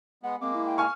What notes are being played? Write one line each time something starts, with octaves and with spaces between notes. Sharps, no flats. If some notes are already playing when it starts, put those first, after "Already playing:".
G#3 B3 F#5
G#3 A#3 C4 D6
E4
G5
G#5 C#6 F6